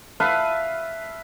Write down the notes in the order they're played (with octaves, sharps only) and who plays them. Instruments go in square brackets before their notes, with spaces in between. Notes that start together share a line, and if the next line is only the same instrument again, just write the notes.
[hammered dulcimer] B4 E5 F5 A5